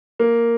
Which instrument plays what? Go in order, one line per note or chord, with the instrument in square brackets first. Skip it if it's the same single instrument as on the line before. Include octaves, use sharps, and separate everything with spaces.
[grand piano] A#3